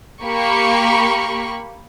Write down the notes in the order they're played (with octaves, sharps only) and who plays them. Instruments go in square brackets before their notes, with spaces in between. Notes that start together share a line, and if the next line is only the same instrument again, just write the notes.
[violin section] A#3 G4 B5 C#6